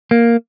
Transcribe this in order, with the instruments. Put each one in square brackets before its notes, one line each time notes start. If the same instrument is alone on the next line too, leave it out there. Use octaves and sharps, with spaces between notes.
[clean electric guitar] A#3